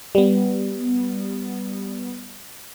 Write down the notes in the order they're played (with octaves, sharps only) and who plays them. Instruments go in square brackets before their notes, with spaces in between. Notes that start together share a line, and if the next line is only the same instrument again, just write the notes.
[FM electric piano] G3 B3